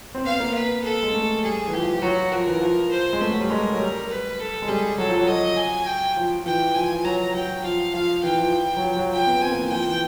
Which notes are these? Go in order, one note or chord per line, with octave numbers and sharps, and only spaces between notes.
C4
B3 F5
A#3
B4
A4
G#3
A3
G3 G#4
E3
F3 G4
F3
F3
F#3 F#4
F3 A#4
E3
F3
C5
G#3
A3 B4
F#3
G3
G#3 A#4
F#3
G3
B4
A4
G#3
G3 G#4
F#3 A4
F3
F#3
F#3 D#5
G#5
G5
F3
F3
E3 G5
F3 G#5
E3
F3
F#3 A#5
F#3 G5
F3 F5
F3 F5
E3 G5
F3
F#3
F3
F#3
F3 G5
B3
C4 G#5
A#3
E3
F3 G5
E3